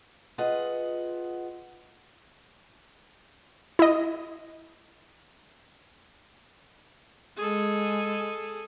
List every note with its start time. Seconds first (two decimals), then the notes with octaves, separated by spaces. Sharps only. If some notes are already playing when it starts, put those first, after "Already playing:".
0.38 F4 G#4 B4 D#5 F#5
3.79 E4 D#5
7.37 G#3 G#4 A4